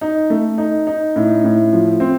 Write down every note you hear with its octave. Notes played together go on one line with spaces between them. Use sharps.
D#4
A3
D#4
D#4
A2
A2
F3
C4